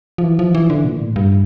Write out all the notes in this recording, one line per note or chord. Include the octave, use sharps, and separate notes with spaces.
F3
E3
F3
E3
D3
A#2
A2
G2